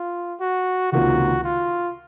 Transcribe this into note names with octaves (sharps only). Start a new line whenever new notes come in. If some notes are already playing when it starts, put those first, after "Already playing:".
Already playing: F4
F#4
C#2 C3 D#3 A#3 F4 F#4
F4